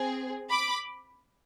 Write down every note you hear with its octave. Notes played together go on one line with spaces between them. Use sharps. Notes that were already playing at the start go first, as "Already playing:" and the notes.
Already playing: C4 G#4
B5 D6